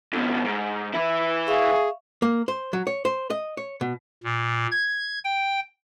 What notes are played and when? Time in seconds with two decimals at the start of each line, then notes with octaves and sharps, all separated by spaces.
0.13 F2 B2
0.45 G#2
0.95 E3 E4
1.47 G#4 E5 F5 C#6
2.22 A#3
2.48 C5
2.73 F#3
2.87 C#5
3.05 C5
3.30 D#5
3.57 C#5
3.81 B2
4.24 A#2
4.72 G#6
5.24 G5